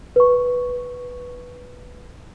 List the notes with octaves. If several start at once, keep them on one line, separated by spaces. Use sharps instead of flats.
B4 C#6